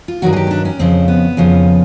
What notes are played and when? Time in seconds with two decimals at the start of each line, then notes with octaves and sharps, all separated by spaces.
0.08 F4
0.22 G2 D#3 F#3 F#4
0.33 G#4
0.36 G4
0.47 C#4
0.51 D4
0.65 C#4
0.79 F2 C#3 F3 C4
1.08 B3
1.37 F2 C#3 F3